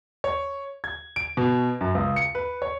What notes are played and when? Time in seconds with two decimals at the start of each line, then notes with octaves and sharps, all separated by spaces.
0.24 C#5
0.84 G#6
1.16 D7
1.37 B2
1.81 F#2
1.95 C#2
2.16 C#7
2.35 B4
2.62 C#5